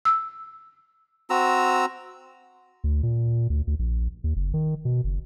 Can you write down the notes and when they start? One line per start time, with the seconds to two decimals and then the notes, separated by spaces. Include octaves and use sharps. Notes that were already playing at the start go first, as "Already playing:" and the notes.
0.05 E6
1.30 C4 F#4 A#5 E6
2.84 D2
3.03 A#2
3.50 D2
3.67 D2
3.79 A#1
4.24 D#2
4.36 F#1
4.54 D#3
4.85 B2
5.04 F#1